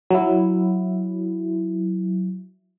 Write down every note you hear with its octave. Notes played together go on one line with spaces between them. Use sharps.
F#3 E4